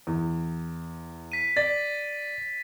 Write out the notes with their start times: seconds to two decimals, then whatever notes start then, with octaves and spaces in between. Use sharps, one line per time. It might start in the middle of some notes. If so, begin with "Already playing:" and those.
0.07 E2
1.32 B6 D#7
1.56 D5 A6